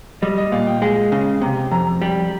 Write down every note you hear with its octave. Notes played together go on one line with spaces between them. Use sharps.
G3 D#5
D#5
A#2 F5
G5
G#3 G#5
C#3
C3 A#5
F2 A#5
G3 G5